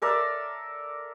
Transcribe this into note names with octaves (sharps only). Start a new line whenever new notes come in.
A4 A#4 D5 E5